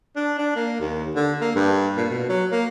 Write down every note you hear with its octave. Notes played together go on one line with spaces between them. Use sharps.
D4
D4
A#3
D#2
D3
A#3
G2
A#2
B2
F#3
A#3